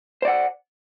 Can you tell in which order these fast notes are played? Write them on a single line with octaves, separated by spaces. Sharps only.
C5 D5 F#5